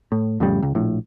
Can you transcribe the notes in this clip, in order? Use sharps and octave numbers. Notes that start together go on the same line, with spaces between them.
A2
F2 A2 C#3 G3
C#2
A#1 A2